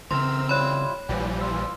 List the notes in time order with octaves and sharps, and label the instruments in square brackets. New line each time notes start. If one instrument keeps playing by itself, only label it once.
[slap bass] C#3 E3 [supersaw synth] C4 E6 [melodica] A#4 E5 [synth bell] C6
[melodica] G3 E4 F4 [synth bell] C#5 B5
[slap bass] A#1 [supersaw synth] E3 F3 G3 [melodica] G5
[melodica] F4 E6